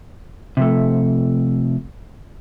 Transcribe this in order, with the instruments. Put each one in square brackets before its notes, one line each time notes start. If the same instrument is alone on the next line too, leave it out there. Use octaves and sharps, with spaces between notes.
[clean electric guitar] C3 F3 A3